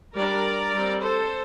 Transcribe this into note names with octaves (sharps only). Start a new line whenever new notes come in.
G3 D4 A#4 D5
G3 C4
A4 C5